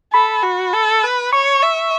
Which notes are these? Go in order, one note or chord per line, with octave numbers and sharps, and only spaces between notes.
A4 B5
F#4
A4
B4
C#5 C#6
E5